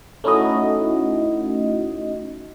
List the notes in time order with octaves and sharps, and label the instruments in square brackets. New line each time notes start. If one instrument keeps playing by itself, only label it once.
[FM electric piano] A3 C#4 D#4 E4 F#4 D#5